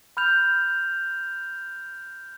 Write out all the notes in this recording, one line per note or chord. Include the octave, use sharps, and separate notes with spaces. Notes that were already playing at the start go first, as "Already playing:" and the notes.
B5 F6 G6 F7